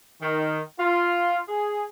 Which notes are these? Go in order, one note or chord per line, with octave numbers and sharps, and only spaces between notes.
D#3
F4
G#4